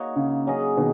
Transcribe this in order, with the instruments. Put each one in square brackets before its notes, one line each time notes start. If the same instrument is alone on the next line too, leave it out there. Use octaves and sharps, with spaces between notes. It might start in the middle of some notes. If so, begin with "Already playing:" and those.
Already playing: [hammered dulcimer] A#3 D#4 F#4 C#5
[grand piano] C#3
[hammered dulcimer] F#3 C#4 G#4 D#5
[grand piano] B2 D#3